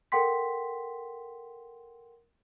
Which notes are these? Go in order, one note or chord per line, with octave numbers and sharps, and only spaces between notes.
A4 A#4 F#5 G5 C6 B6